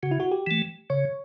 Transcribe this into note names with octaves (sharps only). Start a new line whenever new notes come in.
C#3 F#4
E4
F#4
G4
E3 A3
C#3 C#5